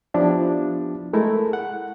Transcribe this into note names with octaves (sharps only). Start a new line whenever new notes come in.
F3 B3 D4 E4 G4
G#3 A3 E4 A#4
F#5